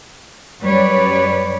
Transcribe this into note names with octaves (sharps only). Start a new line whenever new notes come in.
F#2 G3 B4 C#5 D5